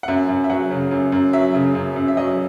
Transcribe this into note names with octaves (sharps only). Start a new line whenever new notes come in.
F#5
F#2 E5
F#2
E5
F#3 F#5
C#3
F#2
F#2
F#3 E5
C#3
F#2
F#2
E5
F#3 D#5